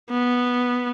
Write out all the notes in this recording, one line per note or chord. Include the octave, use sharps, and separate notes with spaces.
B3